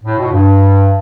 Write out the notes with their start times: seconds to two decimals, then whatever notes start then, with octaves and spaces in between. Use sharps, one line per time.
0.04 A2
0.19 B2
0.33 G2